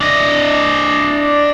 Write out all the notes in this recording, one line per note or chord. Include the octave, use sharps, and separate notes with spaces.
D4 D#5